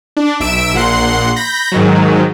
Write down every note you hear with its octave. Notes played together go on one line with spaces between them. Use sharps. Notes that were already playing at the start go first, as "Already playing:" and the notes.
D4
B1 E5 E6 D7 E7
A#1 A#2 F#5 C6 C7
B5 G6 A#6
G#2 D#3 F#3